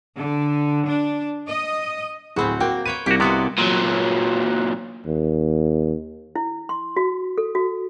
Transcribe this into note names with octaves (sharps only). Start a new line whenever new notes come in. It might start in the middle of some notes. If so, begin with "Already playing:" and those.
D3
D4
D#5
D1 A2 C4 F#4 G#4 B5
A#3 F#4 G5
B4 C#5 G5 D#7
C2 A#3 F#4 G4
C3 G#3 B3 F#4 D5
A#2 F#3
D#2
E4
C6
F#4
A4
F#4